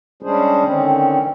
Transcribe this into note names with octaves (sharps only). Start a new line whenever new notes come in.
G3 G#3 C#4 D4 G#4 C5
D3 D#3 C4 C#4